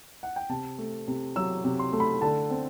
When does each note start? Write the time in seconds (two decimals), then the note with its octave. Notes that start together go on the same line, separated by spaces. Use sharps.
0.23 F#5
0.36 G5
0.49 C3 A5
0.78 A3
1.08 C3
1.36 F#3 E6
1.64 C3
1.79 C6
1.93 A3
2.00 B5
2.22 D3 A5
2.50 C4